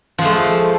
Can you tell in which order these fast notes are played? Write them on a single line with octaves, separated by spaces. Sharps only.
F3 G#3 A3